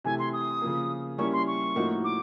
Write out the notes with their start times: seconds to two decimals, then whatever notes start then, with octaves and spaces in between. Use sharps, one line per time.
0.04 C3 E3 A3 G#5
0.19 C6
0.33 D#6
0.62 C#3 F3 A#3
1.18 G3 A#3 C#4 E4 C#6
1.33 C6
1.47 C#6
1.76 A2 F3 A#3 D#4 F#4
2.04 D6